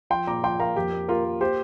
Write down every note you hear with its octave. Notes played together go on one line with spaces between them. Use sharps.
F3 G5 C6
A#2 A#5 D6
F3 G5 C6
A#3 F5 A#5
F2 G4
A#3
A#3 F4 A#4
A#3
A#3 G4 C5